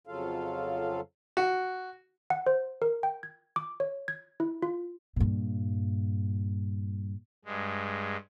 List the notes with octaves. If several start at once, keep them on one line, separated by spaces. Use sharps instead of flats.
F2 C#3 F#3 F4 A4 F5
F#4
F#5
C5
A#4
G5
G#6
D6
C#5
G#6
E4
F4
G2 A#2
G2 G#3